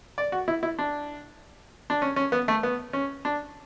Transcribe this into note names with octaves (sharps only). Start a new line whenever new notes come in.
D5
F#4
E4
E4
D4
D4
C#4
C#4
B3
A3
B3
C#4
D4